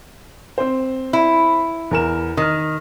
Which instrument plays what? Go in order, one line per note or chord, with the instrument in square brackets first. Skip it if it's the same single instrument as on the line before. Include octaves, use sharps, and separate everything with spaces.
[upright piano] C4 C5
[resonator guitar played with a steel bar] E4
[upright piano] E2 A#4 E7
[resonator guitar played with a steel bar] D#3 [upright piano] D#6 F6